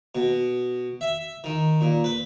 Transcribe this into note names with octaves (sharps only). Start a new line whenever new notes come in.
B2
E5
D#3
A#2
B4